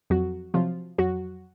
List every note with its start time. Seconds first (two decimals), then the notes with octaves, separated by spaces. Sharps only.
0.10 F2 F#3 F#4
0.54 C3 F3 F#3 F4
0.98 F2 F#3 F#4